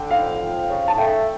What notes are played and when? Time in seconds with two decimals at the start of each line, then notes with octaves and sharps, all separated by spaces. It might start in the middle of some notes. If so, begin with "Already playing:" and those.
Already playing: D3 G5
0.10 F2 F5
0.39 F3
0.69 C#3
0.88 A5
0.97 A3 G5